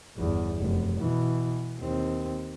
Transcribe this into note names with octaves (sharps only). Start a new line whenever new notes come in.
G1 E2
F1 F#2
B2 E3
D#2 C4